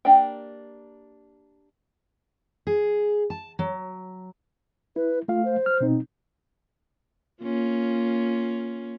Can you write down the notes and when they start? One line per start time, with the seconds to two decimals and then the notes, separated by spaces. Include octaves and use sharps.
0.05 A#3 D4 G4 G5
2.67 G#4
3.30 A5
3.59 F#3
4.96 E4 B4
5.28 A3 F4 F5
5.45 C5
5.66 F6
5.81 B2 C4 D#4
7.42 A#3 C#4 F4